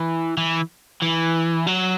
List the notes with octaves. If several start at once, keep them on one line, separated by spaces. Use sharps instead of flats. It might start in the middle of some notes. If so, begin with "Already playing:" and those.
Already playing: E3
E3
E3
F#3